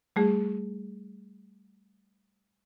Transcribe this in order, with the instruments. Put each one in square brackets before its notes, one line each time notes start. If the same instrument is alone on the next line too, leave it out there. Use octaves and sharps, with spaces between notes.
[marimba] G3 A3 G#4